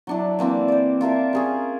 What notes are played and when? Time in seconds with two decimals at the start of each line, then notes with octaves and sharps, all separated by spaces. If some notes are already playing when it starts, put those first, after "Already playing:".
0.07 F#3 D4 E4
0.39 E3 A#3 C4 D4
0.68 C5 D5
1.01 F4 A#4 E5 A5
1.33 C#4 G#4 A#4